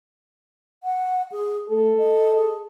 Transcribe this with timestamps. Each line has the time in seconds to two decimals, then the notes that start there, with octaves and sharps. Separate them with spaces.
0.83 F#5
1.32 G#4
1.69 A3 A4
1.98 D#5
2.36 G#4